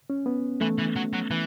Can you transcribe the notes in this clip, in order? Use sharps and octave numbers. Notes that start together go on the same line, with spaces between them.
C#4
B3
E3 A3
E3
F#3
F#3
E3